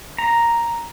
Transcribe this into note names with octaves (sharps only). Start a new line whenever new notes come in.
A#5